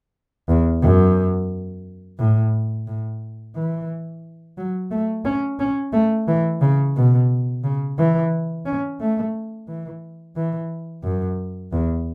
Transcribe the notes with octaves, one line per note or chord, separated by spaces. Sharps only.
E2
F#2
A2
A2
E3
F#3
A3
C#4
C#4
A3
E3
C#3
B2
C#3
E3
C#4
A3
E3
E3
F#2
E2